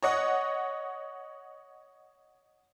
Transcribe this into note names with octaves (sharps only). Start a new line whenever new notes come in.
C#5 D#5 F#5